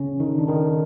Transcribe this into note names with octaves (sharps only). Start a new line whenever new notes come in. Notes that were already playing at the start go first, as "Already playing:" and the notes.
Already playing: C#3 C#4
D#3 D#4
D4
D#3 D#4